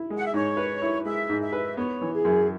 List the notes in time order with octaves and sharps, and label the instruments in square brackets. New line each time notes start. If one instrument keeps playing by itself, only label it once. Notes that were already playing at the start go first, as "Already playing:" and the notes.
Already playing: [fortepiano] E4
G#3
[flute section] F#5
E5
[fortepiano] G#2 [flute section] C#5
[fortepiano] B4
E4
[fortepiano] G#3 [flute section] E5
[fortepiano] G#2
[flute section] E5
[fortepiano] B4
[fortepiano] B3 [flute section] C#5
[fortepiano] E3
[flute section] G#4
[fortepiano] F#2